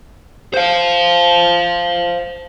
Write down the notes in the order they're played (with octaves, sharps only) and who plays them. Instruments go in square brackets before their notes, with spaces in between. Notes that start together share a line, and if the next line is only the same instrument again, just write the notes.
[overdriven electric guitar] C5 F5